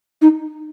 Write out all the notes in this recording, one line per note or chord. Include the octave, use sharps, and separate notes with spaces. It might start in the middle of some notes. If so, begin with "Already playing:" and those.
D#4